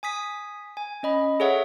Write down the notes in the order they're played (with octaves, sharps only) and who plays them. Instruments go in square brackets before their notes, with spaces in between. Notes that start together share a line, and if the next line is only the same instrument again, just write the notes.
[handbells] G#5 D#6 B6
G#5
C#4 D#5 B5
G#4 A4 C#5 E5 F#5